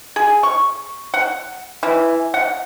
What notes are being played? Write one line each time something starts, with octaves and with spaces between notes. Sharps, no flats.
G#4
C#6
F#5
E3
F#5